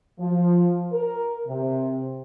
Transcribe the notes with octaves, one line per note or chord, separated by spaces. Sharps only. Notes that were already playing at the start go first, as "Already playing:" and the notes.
F3
A#4
C3